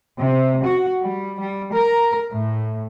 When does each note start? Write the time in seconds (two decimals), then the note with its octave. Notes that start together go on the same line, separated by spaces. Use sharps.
0.20 C3
0.65 F#4
1.04 G3
1.40 G3
1.73 A#4
2.33 A2